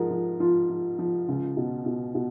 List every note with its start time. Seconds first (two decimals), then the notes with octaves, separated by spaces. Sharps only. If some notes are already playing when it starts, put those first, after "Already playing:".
Already playing: G#2 F3 G#4 A#4
0.10 F3
0.40 F3 F4
0.69 F3
0.99 F3
1.28 C#2
1.57 B2
1.86 B2
2.15 B2